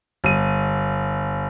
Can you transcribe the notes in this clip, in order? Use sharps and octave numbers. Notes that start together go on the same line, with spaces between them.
G1 D#7